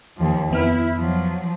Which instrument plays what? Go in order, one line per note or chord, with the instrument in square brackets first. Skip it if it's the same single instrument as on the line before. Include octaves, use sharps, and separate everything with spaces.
[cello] D#2 F3
[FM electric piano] F2 B3 F6 [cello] E4
[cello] F3 F#3